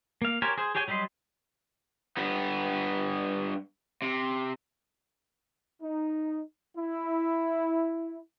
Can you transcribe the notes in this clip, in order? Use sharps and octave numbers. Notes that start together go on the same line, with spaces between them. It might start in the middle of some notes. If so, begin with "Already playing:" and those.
A#3 F5
G4 A#4 C5 C#5 G#5
G#4 C5
G4 G#4 C#5 G5 G#5
F#3 G3 G4 D#5 C6
G2 B3
C3
D#4
E4